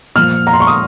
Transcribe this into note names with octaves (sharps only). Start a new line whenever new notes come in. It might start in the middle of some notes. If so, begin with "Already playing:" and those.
A#2 F3 F6
A#5
C6
C#6
D#6